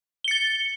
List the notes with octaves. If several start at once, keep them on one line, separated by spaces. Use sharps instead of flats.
A6 C#7 G7